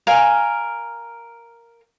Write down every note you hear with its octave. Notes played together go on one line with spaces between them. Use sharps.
A#4 F5 G#5